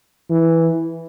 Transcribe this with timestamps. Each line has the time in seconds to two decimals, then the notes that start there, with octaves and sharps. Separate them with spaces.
0.30 E3